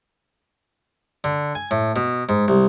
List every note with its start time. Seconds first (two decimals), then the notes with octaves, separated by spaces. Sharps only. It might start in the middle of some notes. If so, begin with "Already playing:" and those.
1.24 D3
1.55 G#5
1.71 A2
1.96 B2
2.29 G#2
2.48 C2